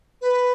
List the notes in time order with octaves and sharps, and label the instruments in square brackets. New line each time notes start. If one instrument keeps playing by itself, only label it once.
[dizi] B4